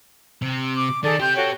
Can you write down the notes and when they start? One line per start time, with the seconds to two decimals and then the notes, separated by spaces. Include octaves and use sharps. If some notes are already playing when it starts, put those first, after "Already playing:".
0.42 C3
0.75 D6
1.04 D#3 G#4 A4 D5
1.20 C4 G4 G5 C6 G6
1.35 F#4 A4 C#5